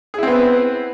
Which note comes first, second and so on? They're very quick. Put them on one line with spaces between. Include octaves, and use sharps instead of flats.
G#4 E4 C4 B3 B4